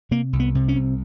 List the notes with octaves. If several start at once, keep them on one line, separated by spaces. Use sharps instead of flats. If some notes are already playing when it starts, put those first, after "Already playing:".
C3 A#3
C2
B3
C3
C#4
C2